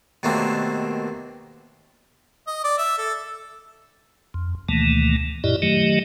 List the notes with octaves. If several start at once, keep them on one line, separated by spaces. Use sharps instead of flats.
D#2 B2 A3 A#3 C4 D4
D#5
D5
E5
A4
F2
D2 B2 D#3 E3 A3 A#3
F#2 A#2 E4 G4 D5 D#5
D#3 F#3 A3 G4 D#5